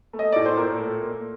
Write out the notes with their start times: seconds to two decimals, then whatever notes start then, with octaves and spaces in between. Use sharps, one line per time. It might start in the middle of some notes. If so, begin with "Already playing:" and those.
0.13 A3
0.19 D#5
0.32 A2 D5
0.46 C5
0.57 A#2 A#4
0.79 A3
1.02 A#3